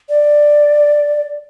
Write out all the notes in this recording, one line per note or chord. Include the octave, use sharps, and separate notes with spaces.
D5